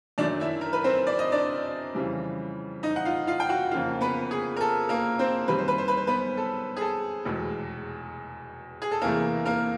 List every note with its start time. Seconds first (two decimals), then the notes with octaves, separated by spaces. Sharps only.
0.18 F#2 D#3 F#3 A3 D4 D5
0.40 E4 E5
0.61 A#4
0.73 B4
0.84 C4 C5
1.07 D5
1.19 D#5
1.32 D4 D5
1.95 F2 C#3 E3 G3
2.83 D#4 D#5
2.96 F#5
3.05 F4 F5
3.27 F4 F5
3.40 G5
3.49 F#4 F#5
3.71 F2 C#3 F3 A#3 F4 F5
4.01 B3 B4
4.31 G#4
4.56 A#4
4.61 A4
4.89 A#3 A#4
5.19 C4 C5
5.48 F#2 D#3 G3 B4
5.58 C5
5.68 B4
5.78 C5
5.88 B4
5.97 C5
6.07 B3 B4
6.37 A4
6.77 G#4
6.81 A4
7.25 F1 E2 B2 G#3
8.82 G#4
8.91 A4
9.01 E2 C3 E3 A3 A#3 A#4
9.46 A#3 A#4